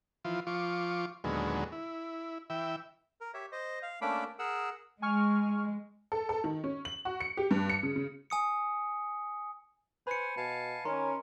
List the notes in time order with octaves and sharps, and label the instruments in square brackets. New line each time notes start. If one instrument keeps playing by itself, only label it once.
[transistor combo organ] E3 F3 F4
F3 F4 C#6 D6
D#2 A#2 D3 F#3 G#3 B3
E4
E3 E5 G5
[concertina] A#4
G4 C#5 E5
C5 D#5
F5
A3 A#3 C#4 D4 B5 D6
G#4 A#4 F#5 E6
[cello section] G#3 [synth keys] G#5 C#6 F6
[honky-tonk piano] A4
A4
D#3
C#4
F#7
F#4
C#7
G4
G2
C#7
C#3
C#3
[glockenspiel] G#5 D#6 C#7
[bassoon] B4 [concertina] C5 G#5 [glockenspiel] B5 C#7
[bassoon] B2 [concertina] F5 G#5 A5
[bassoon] D#3 [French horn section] C#4 [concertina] A#4 [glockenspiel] A#5 C6